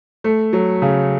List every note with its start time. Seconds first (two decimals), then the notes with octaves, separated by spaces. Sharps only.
0.24 A3
0.53 F#3
0.82 C#3